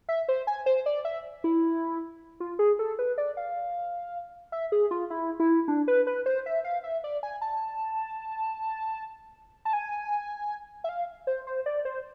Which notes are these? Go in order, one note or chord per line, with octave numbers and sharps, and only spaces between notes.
E5
C5
G#5
C5
D5
E5
E4
F4
G#4
A4
B4
D5
F5
E5
G#4
F4
E4
E4
D4
B4
B4
C5
E5
F5
E5
D5
G#5
A5
A5
G#5
E5
F5
C5
C5
D5
C5